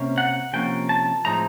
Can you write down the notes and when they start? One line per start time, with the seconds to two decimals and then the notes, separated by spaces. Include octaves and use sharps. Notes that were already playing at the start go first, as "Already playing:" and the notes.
Already playing: C3 A#3 C#4
0.18 F#5
0.53 C3 F3 A#3 C#4 G5
0.89 A5
1.25 A2 F3 G#3 C4 D#4 A#5